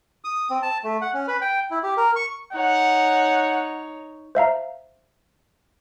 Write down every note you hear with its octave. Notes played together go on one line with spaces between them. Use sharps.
D#6
C4
A5
A3
F#5
C#4
B4
G5
E4
G4
A#4
C#6
D#4 C#5 F#5
C5 E5 F5 A#5